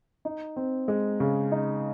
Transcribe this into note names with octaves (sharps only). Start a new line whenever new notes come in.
D#4
C4
G#3
C#3
D#4